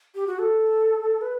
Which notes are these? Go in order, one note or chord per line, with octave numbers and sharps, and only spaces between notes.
G4
F#4
A4
B4